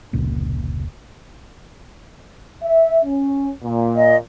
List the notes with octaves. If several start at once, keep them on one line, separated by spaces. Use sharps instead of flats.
F1 C#2 A#2
E5
C#4
A#2
D#5